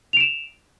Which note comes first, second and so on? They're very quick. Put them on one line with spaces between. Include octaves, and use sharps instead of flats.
F7 D7 E7